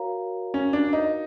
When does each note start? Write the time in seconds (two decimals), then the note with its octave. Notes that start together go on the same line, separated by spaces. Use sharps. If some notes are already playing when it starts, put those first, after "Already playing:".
Already playing: F#4 A#4 C#5 F5 A#5
0.54 C#4
0.73 D4
0.93 D#4